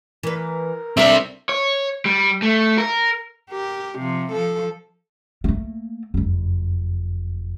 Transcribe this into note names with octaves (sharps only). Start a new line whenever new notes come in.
E3 A#4 B4
G3 C4 D4 A4 A#4 E5
C#5
G3
A3
A#4
G4 A#4
C3 F3
F3 A4
A3 A#3
F#1 F2